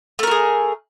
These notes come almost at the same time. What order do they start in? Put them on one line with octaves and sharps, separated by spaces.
A3 A#4 F#4 G#4